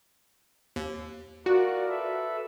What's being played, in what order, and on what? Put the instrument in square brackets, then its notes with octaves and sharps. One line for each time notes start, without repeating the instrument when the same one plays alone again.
[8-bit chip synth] D#2
[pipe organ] F4 A#4 D5 [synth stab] F#4
[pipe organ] A4 B4 E5